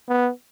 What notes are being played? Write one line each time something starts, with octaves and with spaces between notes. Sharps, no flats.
B3